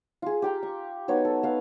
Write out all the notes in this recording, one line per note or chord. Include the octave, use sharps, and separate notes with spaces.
F4 G#4
G4 G5 A#5
C#6
F#3 B3 D#4 C#5
A4
B3 F5